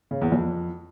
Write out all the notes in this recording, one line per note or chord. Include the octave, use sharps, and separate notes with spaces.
C#3
E2
F2